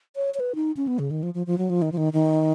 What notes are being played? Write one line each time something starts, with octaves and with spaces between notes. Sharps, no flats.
C#5
C#5
B4
D#4
C#4
B3
C#3
D#3
F3
F3
F3
F#3
F3
D#3
F3
D#3
D#3